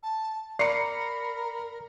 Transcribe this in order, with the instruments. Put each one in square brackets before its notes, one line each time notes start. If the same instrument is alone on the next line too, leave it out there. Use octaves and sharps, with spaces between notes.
[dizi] A5
[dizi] A#4 [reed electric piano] D5 [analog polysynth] A#5 B5 [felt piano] C7 C#7